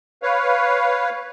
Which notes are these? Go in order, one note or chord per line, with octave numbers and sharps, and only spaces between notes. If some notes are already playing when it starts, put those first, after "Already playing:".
B4 C#5 F5